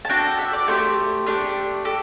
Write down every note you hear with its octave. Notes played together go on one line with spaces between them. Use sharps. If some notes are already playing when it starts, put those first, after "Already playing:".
A5
D4 F#4 A4 G5
E5
D5
A3 E4 G4 C5
A3 D4 G4
G4 A4